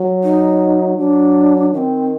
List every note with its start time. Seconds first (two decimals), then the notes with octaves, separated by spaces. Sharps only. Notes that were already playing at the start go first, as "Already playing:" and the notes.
Already playing: F#3
0.24 D#4
0.98 F#3 D4
1.73 D#3 D4
1.78 C4